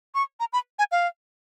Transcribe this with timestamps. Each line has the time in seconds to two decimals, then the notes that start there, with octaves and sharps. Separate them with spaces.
0.15 C#6
0.40 A#5
0.53 B5
0.79 G#5
0.92 F5